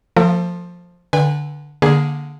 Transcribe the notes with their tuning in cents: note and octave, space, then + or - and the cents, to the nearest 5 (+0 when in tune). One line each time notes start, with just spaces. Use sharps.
F3 +10 A#3 -45 A4 +40
D3 +0 B4 -20 G#5 -40
D3 +0 A#3 +20 G#4 +0